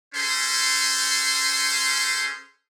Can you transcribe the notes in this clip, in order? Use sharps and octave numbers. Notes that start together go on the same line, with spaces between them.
C#4 G#4 A4 C5 C6